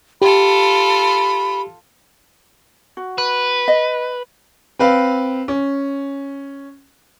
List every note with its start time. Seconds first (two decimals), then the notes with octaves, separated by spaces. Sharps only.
0.22 F4 G4 A4 B5
2.97 F#4
3.18 B4
3.68 D#5
4.79 C4 B4 F5
5.48 C#4